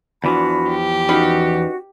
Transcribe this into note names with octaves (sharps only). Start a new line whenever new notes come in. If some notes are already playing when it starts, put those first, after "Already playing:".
E2 E3 F3 D4 F#4 B5
G4
C#4 D#4 F#4 B4